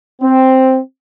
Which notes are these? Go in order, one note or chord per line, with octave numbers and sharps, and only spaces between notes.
C4